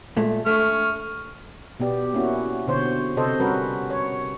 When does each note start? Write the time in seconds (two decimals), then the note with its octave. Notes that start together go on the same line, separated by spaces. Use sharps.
0.17 A#2 G#3 A3
0.46 A3 C#6 F6
1.80 B2 B3 G4 D5
2.14 A#3 C#4 E4 F#4
2.67 B2 D3 C5 C#5
3.17 C3 C4 A4 C5 D#5
3.40 G3 C#4 F#4 A#4 B4
3.90 C#5